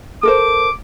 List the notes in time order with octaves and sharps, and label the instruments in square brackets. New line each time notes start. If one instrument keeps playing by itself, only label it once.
[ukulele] A4 A#4 C5 [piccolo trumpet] D6